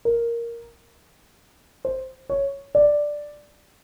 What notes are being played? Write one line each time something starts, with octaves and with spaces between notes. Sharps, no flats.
A#4
C5
C#5
D5